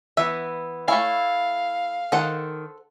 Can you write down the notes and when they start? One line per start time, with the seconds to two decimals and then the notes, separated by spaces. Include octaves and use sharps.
0.17 E3 B3 E5
0.88 A3 E4 C#5 F5 G#5
2.12 D#3 A4 C5 F#5